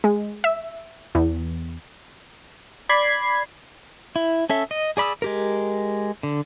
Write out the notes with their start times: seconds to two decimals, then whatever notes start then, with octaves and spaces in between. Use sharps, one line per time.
0.04 G#3
0.44 E5
1.15 E2
2.89 D5 B5 G#6 C7
4.16 E4
4.50 C#4 A4 E5
4.71 D#5
4.97 G#4 D5 B5 D#6 E6
5.22 G#3 G4 A#4
6.23 D3